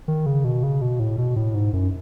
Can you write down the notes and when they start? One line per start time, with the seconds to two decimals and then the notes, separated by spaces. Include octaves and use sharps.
0.08 D#3
0.26 C#3
0.44 B2
0.63 C#3
0.82 B2
0.99 A2
1.18 B2
1.36 A2
1.55 G#2
1.73 F#2